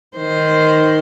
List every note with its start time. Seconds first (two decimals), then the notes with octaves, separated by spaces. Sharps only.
0.17 D#3 C5